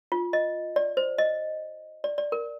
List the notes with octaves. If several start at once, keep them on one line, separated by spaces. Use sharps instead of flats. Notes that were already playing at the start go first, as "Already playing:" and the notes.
F4
D#5
D5
C5
D#5
D5
D5
A#4